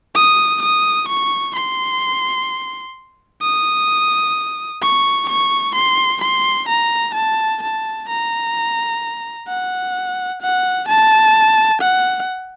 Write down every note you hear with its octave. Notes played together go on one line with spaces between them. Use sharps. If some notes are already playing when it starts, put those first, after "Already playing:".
D#6
D#6
C#6
C6
D#6
C#6
C#6
C6
C6
A#5
A5
A5
A#5
F#5
F#5
A5
F#5